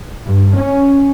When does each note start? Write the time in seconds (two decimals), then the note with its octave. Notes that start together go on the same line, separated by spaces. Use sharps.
0.25 G2
0.56 C#4